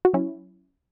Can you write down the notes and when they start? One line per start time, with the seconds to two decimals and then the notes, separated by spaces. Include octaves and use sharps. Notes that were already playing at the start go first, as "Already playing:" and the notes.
0.05 F#4
0.14 F#3 C#4 E4